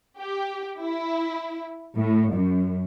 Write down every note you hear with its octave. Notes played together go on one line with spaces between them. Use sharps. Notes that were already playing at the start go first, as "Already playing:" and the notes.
G4
E4
A2
F#2